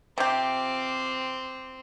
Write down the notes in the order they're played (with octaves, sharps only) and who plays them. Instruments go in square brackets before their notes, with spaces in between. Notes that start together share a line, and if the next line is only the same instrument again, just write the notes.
[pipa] C3 G4 [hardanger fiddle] C4 [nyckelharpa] F4 D6